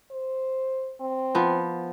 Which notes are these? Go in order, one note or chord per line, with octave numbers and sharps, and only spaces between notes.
C5
C4
F3 B3